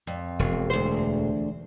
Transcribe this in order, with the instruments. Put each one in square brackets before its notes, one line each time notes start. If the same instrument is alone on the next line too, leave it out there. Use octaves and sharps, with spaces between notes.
[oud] F2
[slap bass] E1
[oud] D2 C5